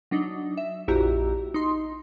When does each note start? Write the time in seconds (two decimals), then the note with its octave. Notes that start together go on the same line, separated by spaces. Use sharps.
0.11 F#3 D4 D#4
0.57 E5
0.88 A#1 F2 E4 F#4 G4 A#5
1.54 D#4 C6